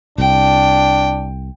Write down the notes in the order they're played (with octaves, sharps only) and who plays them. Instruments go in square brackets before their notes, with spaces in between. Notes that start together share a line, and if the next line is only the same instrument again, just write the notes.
[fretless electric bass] C2 [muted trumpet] D4 [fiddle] G5